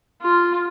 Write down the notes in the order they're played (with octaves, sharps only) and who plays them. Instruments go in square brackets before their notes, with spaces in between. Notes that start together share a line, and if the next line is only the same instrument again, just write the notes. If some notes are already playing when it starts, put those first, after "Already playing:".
[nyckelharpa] F4